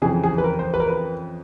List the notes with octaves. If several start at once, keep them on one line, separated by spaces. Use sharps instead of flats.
F2 C#3 E3 G#4
G#4
B4
A#4
C5
B4
A#4
B4